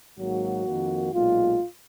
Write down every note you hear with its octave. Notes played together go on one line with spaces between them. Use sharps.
G#1 G#2 F#3 A#3 F#4
F2 D#3 A#3
B1 A#2 G#3 F4